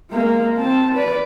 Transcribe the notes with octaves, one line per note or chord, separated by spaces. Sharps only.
G#3 A#3
C4 A5
B4 D5